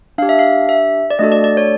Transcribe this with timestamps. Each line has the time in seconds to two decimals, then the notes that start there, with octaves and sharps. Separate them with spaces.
0.18 D4 G4 F5
0.29 E5
0.39 F5
0.69 E5
1.10 D5
1.19 A3 D4 F#4 A4 D#5
1.32 D5
1.44 D5
1.57 C#5